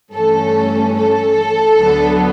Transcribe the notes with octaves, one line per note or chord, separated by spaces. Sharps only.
G2 E3 A3 C#4 A4
A4
D2 D3 F#3 B3